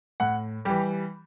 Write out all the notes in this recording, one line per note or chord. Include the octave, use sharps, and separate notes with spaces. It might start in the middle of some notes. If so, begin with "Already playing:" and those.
A2 F#5
E3 G3 G4